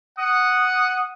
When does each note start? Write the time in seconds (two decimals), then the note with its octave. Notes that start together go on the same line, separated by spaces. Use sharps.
0.18 F#5 D#6